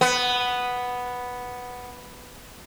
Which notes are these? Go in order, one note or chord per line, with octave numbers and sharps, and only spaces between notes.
B3